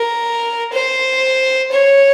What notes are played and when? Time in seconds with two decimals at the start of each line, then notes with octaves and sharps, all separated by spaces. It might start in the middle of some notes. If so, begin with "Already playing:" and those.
Already playing: A#4
0.73 C5
1.72 C#5